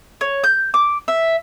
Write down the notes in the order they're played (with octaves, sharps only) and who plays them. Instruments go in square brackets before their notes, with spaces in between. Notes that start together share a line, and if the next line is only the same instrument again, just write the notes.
[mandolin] C#5
G6
D6
E5